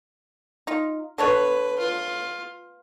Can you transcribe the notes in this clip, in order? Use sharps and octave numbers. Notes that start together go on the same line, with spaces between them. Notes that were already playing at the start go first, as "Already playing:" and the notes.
D#4 F4
D3 D4 B4 C#5
F4